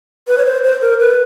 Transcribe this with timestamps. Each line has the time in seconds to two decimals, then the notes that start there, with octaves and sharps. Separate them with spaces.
0.28 B4
0.38 C#5
0.45 C5
0.64 C5
0.81 A#4
1.00 B4